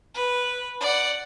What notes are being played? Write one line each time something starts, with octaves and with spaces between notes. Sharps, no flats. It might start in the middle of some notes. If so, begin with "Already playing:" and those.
B4
D5 F#5